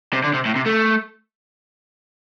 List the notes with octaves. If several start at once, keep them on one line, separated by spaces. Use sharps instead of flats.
C3
D3
C3
A2
C3
A3